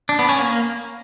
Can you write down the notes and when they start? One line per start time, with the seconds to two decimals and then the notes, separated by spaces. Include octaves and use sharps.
0.09 D4
0.19 B3
0.29 C#4
0.39 A#3